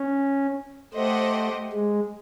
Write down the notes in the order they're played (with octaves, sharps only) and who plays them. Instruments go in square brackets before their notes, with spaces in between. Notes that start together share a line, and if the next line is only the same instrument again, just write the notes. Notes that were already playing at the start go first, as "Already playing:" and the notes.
Already playing: [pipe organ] C#4
[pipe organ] A3 [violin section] G4 C5 D#5 F#5
[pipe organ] G#3